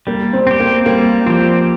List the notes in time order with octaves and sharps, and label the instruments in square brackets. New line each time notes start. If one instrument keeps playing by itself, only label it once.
[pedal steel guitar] G3 [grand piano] A#3
[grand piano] C4
[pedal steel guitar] C4 G4
[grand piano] A#3
[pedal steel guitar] G3 [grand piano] A#3
[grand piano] F3 [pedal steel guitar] C4 G4